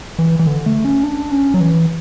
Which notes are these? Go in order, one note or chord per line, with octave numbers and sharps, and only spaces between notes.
E3
E3
D3
A3
C#4
D4
C#4
F#3
E3